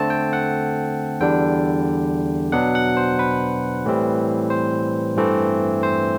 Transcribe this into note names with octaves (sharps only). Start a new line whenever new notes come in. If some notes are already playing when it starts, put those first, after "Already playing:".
Already playing: D3 A3 C4 A5
G5
F#5
E2 D3 G3 D4 G5
B2 F#3 B3 D4 F#5
F#5
C5
B4
A2 E3 G3 C4
C5
G2 E3 A3 C4
C5